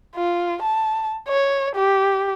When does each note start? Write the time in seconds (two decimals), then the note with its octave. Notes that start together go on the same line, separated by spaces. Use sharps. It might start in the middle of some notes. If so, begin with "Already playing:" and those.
0.16 F4
0.62 A5
1.28 C#5
1.75 G4